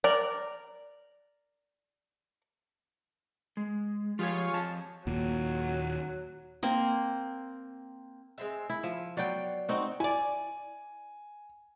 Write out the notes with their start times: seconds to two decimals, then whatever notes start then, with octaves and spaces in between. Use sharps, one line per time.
0.04 A#4 D5
3.57 G#3
4.19 F3 F4 G4 G#4 C#5
4.53 F2 A5
5.07 D#2 A#2 F#3
6.63 A#3 C4
8.38 G#3 C4 E5
8.70 E4
8.83 F3 E5
9.17 F#3 B3 D5 F5 G5
9.69 C4 D#4 F#4
10.00 E4 D5 G#5